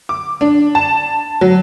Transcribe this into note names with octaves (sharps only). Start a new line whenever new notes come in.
D6
D4
A5
F#3